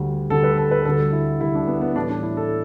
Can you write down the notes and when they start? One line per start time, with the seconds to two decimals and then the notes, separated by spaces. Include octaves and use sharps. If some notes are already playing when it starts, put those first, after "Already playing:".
Already playing: D2 D3 G3
0.30 D2 D3 G3 A4
0.44 B4
0.58 A4
0.71 B4
0.85 D2 D3 G3 A4
1.13 E4
1.41 D2 D3 G3 E4
1.55 D4
1.68 B3
1.81 B3
1.96 A2 E3 G3 D4
2.10 D4
2.23 E4
2.37 A4